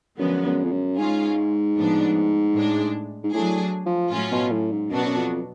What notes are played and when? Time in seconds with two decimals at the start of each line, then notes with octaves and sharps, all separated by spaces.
0.19 F#2 D3 F3 G#3 B3
0.45 F#2
0.64 F2
0.72 F#2
0.98 G#2 G#3 C#4 F4 G#4
1.76 A2 F3 B3 D4
2.54 A2 G#3 D4
3.23 G#2
3.33 A2 F#3 A3 D4 G#4
3.86 F3
4.12 A2 F#3 C#4 F4
4.32 B2
4.51 A2
4.71 G#2
4.90 F#2 B2 F#3 B3 D4 F#4
5.05 F#2
5.17 F2